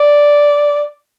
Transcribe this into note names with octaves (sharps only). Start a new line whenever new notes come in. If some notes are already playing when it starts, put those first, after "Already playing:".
Already playing: D5